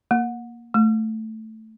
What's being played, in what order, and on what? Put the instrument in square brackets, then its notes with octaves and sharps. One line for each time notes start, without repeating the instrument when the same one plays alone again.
[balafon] A#3
A3